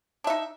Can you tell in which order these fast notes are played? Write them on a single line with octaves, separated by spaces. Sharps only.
D4 E5 D#4